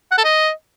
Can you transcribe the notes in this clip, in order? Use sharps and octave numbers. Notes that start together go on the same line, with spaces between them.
F#5
A4
D#5